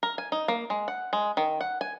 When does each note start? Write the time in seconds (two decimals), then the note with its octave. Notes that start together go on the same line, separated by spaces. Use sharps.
0.03 A#4
0.18 G#5
0.32 D#4
0.48 A#3
0.70 G#3
0.88 F#5
1.13 G#3
1.37 D#3
1.61 F#5
1.81 G#5